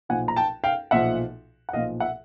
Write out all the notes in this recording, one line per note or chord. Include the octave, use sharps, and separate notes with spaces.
B1 A#2 F3 F#5 G#5
A#5
G5 A5
F5 G5
B1 A#2 F3 E5 F#5
F#5
B1 A#2 F3 D#5 F5
E5 F#5